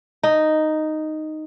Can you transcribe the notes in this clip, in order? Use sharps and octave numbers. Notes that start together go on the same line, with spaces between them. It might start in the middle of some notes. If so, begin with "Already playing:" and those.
D#4